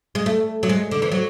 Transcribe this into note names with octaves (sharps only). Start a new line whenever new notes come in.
G#3
A3
F#3
G#3
D3
E3
F#3